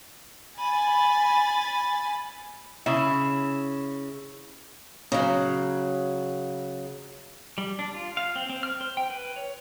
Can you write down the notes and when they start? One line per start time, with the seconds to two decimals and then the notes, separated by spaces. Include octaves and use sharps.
0.59 G#5 B5 A6
2.86 C#3 E4
5.12 C#3 F#3
7.58 G3
7.79 D4
7.94 F4
8.17 F5
8.36 C4
8.50 C4
8.63 F6
8.81 C5
8.97 G5
9.10 B4
9.36 C#5